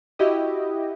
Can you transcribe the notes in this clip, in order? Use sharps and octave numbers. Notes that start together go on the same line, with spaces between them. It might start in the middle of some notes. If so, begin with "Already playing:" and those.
E4 F#4 G4 D#5